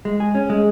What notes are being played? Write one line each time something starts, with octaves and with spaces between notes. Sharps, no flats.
G#3
G#4
C#4
G#3